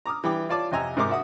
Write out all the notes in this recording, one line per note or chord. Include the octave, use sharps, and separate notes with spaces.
A#5 D6 D#6 F6
E3 G3 G5 D6
F4 C#5 D5 A5 D6
F2 C3 D#5 G#5 A#5 E6
G#2 C3 A#4 A#5 C6 D6
F#4 E5 F#5 D#6